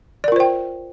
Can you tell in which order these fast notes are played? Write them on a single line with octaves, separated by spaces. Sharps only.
D5 A#4 F4 C5 G5